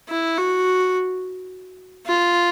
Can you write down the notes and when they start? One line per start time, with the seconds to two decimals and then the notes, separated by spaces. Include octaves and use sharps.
0.09 E4
0.38 F#4
2.07 F4